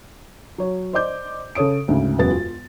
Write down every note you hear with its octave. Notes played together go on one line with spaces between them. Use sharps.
F#3 C#5
C5 D5 D#5 D6 G6
C#3 A4 C#5 D#6 D7
D2 G#2 C#3
E1 F#2 B3 A6
F4